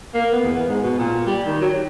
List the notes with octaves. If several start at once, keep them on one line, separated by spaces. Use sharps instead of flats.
A#3
B3
E2
B3
G#2
B2
A#2
G3
D#3
F#3
G4